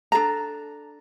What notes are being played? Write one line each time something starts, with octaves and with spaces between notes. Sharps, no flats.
D4 G#4 A4 A#5